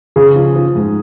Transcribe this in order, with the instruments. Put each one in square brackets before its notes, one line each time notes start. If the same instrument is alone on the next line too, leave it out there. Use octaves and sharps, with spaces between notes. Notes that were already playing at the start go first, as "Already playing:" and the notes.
[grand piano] C#3 [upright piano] G#4
[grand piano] F3
F3
G#2